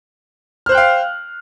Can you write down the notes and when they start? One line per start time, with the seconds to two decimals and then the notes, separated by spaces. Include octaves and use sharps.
0.66 F6
0.69 C5
0.72 F#6
0.75 G5
0.77 F5